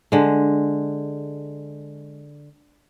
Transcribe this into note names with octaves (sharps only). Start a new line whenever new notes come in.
D3 G#3